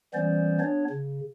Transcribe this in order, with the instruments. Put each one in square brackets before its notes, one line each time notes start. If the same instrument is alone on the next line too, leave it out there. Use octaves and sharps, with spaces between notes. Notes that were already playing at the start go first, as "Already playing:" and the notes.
[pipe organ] E3 G3 B3 C#4 C5 D5
B3 D4 C#5
C#3